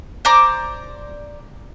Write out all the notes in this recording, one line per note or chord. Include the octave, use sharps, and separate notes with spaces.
C5 D5 A#5 D6